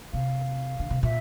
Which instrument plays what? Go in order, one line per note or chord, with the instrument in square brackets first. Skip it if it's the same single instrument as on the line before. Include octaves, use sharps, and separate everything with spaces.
[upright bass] C3 [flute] F5
[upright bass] D3
C3
[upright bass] A#2 [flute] E5